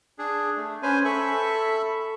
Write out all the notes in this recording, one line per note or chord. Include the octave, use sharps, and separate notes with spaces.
D4 G#4
A3
C#4 B4 C5 G#5
A4 E5 B5 C#6